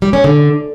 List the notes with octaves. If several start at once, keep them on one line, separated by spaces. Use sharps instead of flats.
G3
C#4
D3